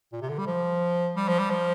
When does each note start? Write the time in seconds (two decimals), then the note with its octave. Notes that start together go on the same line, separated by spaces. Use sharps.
0.13 A#2
0.22 C3
0.29 D3
0.38 G3
0.47 F3
1.16 G3
1.28 F3
1.39 G3
1.50 F3